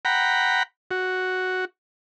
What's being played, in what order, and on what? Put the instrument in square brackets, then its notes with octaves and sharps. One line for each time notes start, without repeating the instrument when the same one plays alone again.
[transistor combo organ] F#5 G5 A#5 B5
F#4